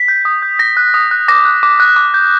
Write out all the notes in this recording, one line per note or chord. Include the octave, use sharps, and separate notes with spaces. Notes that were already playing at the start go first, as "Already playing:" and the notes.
Already playing: B6
G6
D#6
G6
D#6 A#6
F#6
D#6
F#6
D6 A#6
F#6
D6
F#6
D6
G6